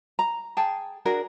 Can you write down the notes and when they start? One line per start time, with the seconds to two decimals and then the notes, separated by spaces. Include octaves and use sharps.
0.19 A#5
0.57 G#4 G5 A5
1.05 D4 F#4 G#4 A#4